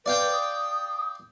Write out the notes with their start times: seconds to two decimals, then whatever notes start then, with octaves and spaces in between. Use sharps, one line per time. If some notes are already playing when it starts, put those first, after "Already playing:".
0.06 B4 D5 F5 G5
0.32 D#6